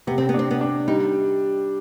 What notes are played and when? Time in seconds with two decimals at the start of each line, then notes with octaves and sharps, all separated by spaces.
0.07 C3 B3
0.18 C4
0.29 B3
0.34 C4 D4
0.51 B3
0.61 D4
0.88 G3 D#4